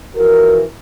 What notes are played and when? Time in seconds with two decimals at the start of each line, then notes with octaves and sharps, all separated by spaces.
0.15 E3 F3 F#4 A#4